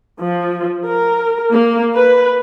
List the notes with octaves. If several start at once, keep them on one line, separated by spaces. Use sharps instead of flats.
F3
A#4
A#3
B4